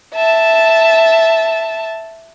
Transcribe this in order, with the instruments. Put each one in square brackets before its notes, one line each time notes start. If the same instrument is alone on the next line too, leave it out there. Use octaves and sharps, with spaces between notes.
[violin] E5 A5